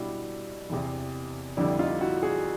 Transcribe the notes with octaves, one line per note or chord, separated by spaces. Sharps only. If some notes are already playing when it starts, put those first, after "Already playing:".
Already playing: B2 G3 D4 E4
E2 C3 E3
F2 D3 G3 D4 E4
D#4 F4
E4 F#4
F#4 G#4